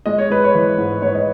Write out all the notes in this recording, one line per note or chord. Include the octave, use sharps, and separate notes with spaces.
G#3 D#5
C#5
G#3 B4
C#5
E3
G#2
G#2 C#5
D#5